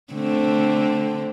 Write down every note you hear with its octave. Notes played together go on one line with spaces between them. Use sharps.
D3 A3 C4